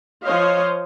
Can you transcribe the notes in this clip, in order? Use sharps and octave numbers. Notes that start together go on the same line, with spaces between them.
F3 C5 C#5 D#5 F5